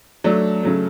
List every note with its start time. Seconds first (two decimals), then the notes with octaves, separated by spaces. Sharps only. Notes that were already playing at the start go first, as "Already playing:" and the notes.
0.24 F#3 A3 D4
0.63 C#3 F#3 A3